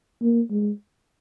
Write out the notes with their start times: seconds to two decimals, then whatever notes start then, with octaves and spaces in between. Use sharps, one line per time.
0.21 A#3
0.50 G#3